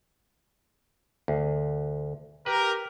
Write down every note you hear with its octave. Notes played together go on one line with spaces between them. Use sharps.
D2
G4 A#4 B4